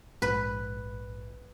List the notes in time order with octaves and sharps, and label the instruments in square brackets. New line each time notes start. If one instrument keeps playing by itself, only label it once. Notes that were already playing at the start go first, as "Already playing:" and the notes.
[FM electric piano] A#1 G#2 [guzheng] B4